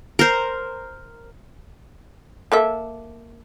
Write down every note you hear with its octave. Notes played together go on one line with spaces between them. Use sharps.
A#4 C5
A#3 A4 E5